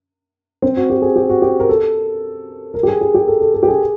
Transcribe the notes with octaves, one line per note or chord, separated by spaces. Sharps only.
C4
F#4
G4
G#4
G4
F#4
G4
A#4
A4
A#4
G4
G#4
G#4
G4
A4
A4
A4
G4
G#4